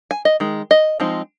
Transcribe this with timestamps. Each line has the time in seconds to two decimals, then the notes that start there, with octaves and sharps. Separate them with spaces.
0.11 G#5
0.25 D#5
0.40 D#3 G#3
0.71 D#5
1.00 F3 G#3 C4 D#4